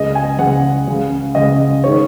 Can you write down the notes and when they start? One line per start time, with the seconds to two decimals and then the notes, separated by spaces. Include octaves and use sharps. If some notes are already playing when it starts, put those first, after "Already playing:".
Already playing: C#2 C#3 G#3 D#5
0.15 G#5
0.39 C#2 C#3 G#3 F#5
0.87 C#2 C#3 G#3
1.35 C#2 C#3 G#3 D#5
1.84 D#3 G#3 C#5